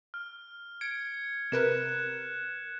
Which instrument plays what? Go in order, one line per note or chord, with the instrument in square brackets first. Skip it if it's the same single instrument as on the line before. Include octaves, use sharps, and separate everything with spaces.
[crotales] F6
[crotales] G#6 C#7 [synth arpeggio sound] D7
[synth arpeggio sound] C3 A#4 B4 [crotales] F#6 E7